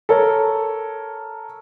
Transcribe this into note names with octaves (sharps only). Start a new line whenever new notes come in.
A4 A#4 C#5